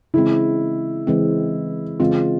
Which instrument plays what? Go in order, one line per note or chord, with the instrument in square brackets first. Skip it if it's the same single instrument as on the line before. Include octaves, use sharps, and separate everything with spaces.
[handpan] C#3 E3 G#3 C4 [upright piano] E4
[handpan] C#3 E3 G#3 C4
[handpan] C#3 E3 G#3 C4 [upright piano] F4